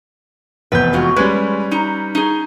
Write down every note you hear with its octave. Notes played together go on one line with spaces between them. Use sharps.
F1 E2 B4 G6
G#3 F4 F#4
G3 G#3 C#4 B4
D#4 A#5
D#4 G#4